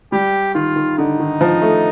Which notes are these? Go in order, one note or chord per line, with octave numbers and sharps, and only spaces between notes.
G3 G4
D#3 F4
D#3
D3 D#4
D#3
F3
A3